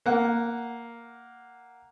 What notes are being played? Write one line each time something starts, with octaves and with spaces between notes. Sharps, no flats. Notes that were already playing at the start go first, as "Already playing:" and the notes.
A#3 F#5